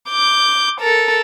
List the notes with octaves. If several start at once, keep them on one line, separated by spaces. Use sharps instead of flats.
D6 G6
A4 A#4